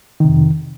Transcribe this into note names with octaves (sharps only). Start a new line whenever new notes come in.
F2 C3 D#3